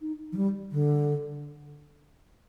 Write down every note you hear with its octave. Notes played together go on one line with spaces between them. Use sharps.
D#4
F3
G3
D3